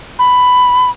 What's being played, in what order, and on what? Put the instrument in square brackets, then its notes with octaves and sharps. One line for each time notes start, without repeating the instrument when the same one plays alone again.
[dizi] B5